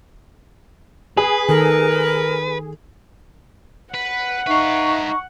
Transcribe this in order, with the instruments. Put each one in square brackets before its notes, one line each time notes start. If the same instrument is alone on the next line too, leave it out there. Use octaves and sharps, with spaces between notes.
[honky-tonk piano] G#4 [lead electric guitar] B4
[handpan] D#3 A4 [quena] A#4
[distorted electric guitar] B4 [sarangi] F#5
[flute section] D#4 E5 [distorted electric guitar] B4 F5 [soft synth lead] C#6